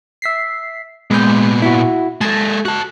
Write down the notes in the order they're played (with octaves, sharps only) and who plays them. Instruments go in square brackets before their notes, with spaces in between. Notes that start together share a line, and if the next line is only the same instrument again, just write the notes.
[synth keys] E5 B6 C7
[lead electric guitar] A#2 B3 [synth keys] G#3 G6
[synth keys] E4 F#4
[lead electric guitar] G#3 A4 [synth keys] A5 G#6 A#6
[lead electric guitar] F#4 A5 [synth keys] F#6